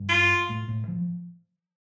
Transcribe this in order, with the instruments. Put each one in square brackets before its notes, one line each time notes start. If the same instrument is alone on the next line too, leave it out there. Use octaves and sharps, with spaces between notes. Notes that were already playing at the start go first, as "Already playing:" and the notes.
Already playing: [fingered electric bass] G2
[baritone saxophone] F4
[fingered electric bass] A2
A2
F3